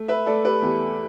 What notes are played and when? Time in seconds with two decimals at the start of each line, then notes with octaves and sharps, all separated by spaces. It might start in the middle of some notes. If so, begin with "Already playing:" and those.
Already playing: A3
0.08 B4 E5
0.26 A3 A4 D5
0.45 G4 B4
0.62 E2 G4